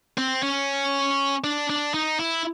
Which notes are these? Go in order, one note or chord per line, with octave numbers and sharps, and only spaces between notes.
C4
C#4
D4
D4
D#4
E4